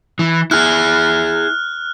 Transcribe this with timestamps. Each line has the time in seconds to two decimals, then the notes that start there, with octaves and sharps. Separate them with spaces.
0.19 E3
0.51 E4 G#4 F6 F#6